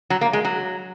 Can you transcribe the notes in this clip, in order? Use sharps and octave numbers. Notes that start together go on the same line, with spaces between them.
F#3
A#3
G#3
F#3